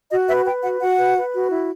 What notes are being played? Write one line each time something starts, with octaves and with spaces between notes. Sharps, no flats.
F#4 D#5
B4 E5
B4 G5
F#4 F#5
F#4 F#5
B4
B4
F#4
E4